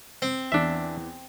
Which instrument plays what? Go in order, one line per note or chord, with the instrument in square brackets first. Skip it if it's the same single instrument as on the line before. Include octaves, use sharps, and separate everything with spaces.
[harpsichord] C4
[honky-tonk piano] E2 E3 [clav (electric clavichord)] D4 E5